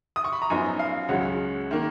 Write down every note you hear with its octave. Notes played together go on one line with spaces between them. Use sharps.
D#6
C#6
B5
A#5
F#2 F3 B3 D#4 G#5
F5
C#2 C#3 F#3 C#4 F#5
D#3 A#3